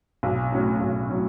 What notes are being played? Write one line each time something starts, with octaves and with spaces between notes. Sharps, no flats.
B1
A2 F#3 C#4
B1
A2 F#3 C#4